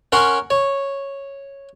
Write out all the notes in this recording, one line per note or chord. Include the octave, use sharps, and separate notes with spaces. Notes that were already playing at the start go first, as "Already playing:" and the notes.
C#4 A#4 C#5 F#5 C6
C#5